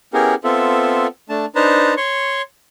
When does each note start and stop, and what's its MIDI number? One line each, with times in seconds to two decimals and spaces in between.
0.13 0.35 59
0.13 0.35 61
0.13 0.35 64
0.13 0.35 67
0.13 0.35 68
0.13 0.35 70
0.44 1.07 59
0.44 1.07 60
0.44 1.07 65
0.44 1.07 69
0.44 1.07 76
1.29 1.45 57
1.29 1.45 62
1.29 1.45 81
1.55 1.94 62
1.55 1.94 63
1.55 1.94 71
1.55 1.94 72
1.55 1.94 81
1.55 1.94 82
1.97 2.42 73
1.97 2.42 84
1.97 2.42 85